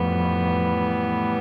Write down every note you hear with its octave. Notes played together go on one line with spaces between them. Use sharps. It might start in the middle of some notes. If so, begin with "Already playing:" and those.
Already playing: F2 A2 E3 G3 B3